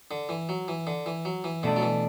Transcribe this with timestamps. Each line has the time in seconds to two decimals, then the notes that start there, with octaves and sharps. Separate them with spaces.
0.11 D3
0.29 E3
0.49 F#3
0.68 E3
0.87 D3
1.06 E3
1.25 F#3
1.44 E3
1.63 B2 D3 A3 D4
1.76 F#3
1.82 E3